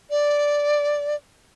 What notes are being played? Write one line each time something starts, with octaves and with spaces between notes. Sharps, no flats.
D5